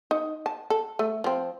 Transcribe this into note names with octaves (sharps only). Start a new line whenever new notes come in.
D#4
A5
A4
A3
F3 C4